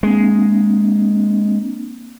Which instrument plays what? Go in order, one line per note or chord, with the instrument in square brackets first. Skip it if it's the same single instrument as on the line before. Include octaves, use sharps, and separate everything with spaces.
[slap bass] G#3 [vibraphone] A#3 C4 D4